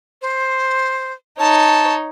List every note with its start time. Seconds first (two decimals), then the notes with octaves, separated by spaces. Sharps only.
0.22 C5
1.39 D#4 C#5 A5